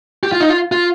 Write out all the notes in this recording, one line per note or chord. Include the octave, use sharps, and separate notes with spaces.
G4
F4
D#4
F4
F4